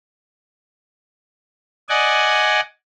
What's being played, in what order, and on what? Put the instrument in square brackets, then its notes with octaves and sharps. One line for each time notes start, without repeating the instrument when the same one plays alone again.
[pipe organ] D5 D#5 F#5 G#5